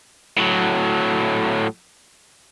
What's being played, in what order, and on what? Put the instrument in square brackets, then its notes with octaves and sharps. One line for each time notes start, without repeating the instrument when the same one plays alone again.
[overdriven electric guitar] A2 F#3